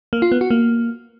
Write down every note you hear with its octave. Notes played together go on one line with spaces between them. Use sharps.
A#3
F4
B3
F#4
A#3